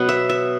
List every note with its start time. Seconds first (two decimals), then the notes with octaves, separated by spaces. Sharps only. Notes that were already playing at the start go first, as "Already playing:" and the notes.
Already playing: B2 F#3 B3 F#5
0.09 E5
0.29 E5